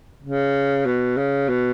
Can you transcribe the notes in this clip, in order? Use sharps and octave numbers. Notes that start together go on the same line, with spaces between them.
C#3
B2
C#3
B2